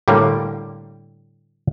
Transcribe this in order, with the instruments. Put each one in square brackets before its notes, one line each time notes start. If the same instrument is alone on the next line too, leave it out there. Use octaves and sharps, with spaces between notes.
[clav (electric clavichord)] A2 D3 G3 A#3